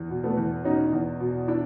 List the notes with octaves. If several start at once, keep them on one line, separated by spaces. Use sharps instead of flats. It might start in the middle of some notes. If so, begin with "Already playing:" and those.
Already playing: E2
B2
A3 B3
E2
B2 C#4 D#4
E2
B2
D4 E4